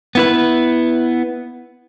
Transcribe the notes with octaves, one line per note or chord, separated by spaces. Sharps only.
B3 E4 B4